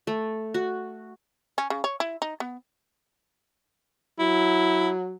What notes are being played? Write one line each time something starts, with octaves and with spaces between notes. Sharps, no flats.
A3
F#4
C#4
C#3
C#5
E4
D#4
B3
F#3 E4